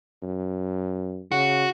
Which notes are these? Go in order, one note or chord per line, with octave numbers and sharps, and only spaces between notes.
F#2
C#3 F#4